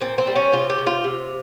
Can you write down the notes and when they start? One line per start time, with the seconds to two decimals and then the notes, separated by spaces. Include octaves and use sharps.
0.01 A#2 C4
0.18 C4
0.27 G3
0.36 C#4
0.52 C3 F4
0.70 G4
0.78 C3
0.87 F4
1.04 C3